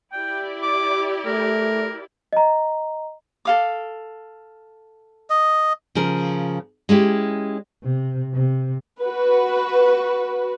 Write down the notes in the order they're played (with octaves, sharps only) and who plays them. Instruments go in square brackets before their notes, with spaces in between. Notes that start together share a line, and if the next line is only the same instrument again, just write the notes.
[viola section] E4 G4 D5 [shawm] G5
[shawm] D6
[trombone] A3 [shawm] A#4
[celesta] D#5 A#5
[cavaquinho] A4 F5 D6
[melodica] D#5
[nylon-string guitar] C#3 F3 A#4
G#3 C#4 E4 G4
[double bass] C3
C3
[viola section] F#4 B4